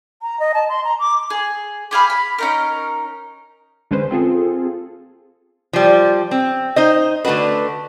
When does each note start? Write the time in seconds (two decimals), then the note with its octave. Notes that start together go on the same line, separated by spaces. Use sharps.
0.22 A#5
0.40 D#5
0.54 A5
0.69 C6
0.84 A#5
0.99 D6
1.30 G#4
1.91 G4 G#4 F5 B5
2.10 B5
2.38 C#4 D#4 A#4
3.91 D3 G#3 C#4 B4 C5
4.11 C4 F4 G#4 A4
5.73 F3 G3
6.31 C4
6.76 D#4 C5 D#5
7.25 D3 A3 D4 F#4 B4